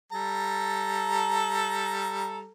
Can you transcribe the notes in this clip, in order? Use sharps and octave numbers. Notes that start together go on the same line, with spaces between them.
G3 A4 A#5